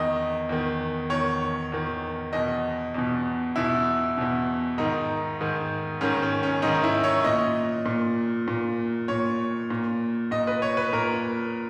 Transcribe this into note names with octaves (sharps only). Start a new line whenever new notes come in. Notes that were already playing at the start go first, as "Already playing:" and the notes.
Already playing: E2 D#3 D#5
E2 D#3
E2 D#3 C#5
E2 D#3
E2 B2 D#5
E2 B2
E2 B2 E4
E2 B2
G#2 D#3 D#4
G#2 D#3
G#2 D#3 C#4
C#4
C#4
G#2 D#3 D#4
E4
C#5
A#2 D#5
A#2
A#2
A#2 C#5
A#2
A#2 D#5
B4
C#5
B4
A#2 A#4